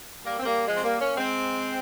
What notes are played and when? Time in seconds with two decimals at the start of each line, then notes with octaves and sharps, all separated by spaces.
0.24 G3 A#3
0.39 C4
0.45 G3 A#3
0.67 F3 G#3
0.76 C4
0.83 G3 A#3
0.99 A#3 C#4
1.16 G#3 C4